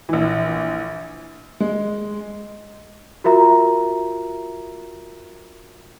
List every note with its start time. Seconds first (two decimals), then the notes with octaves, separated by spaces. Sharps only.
0.09 A#1 E3
1.60 G#3
3.24 F4 F#4 A#4 E5 A#5